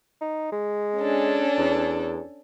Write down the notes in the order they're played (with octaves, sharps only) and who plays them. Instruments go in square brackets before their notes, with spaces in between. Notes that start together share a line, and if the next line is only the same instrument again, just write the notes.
[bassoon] D#4
G#3
[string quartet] C#4 D4 A4
[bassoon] E2